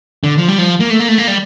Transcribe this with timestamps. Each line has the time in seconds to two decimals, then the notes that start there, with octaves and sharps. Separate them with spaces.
0.24 D3
0.38 F3
0.48 G3
0.58 F3
0.80 A#3
0.90 A3
1.00 A#3
1.08 A3
1.18 A#3
1.28 G3